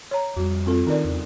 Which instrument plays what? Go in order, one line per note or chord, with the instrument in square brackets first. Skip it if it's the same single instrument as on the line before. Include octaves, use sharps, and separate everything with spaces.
[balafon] C#5 A#5
[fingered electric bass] F2 G3 [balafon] F#4
[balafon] C4 F4 A4
[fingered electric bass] D#3 D4 [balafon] D#4 A#4 D5
[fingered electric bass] E2 C#3